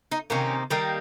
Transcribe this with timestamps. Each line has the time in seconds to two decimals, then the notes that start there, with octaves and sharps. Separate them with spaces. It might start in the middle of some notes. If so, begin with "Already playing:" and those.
0.11 D#4
0.30 C3 D#3 A#3 C#4
0.70 D#3 G3 A#3